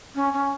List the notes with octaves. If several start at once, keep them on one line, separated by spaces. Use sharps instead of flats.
C#4
C#4